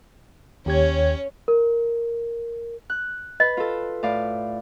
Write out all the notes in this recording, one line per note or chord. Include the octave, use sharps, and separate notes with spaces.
D#2 C#4 G4 C#5 G#6
A#4
F#6
B4 D#5
F4 A4
A2 D5 F5